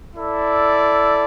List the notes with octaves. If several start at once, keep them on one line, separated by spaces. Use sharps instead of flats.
E4 A4 D5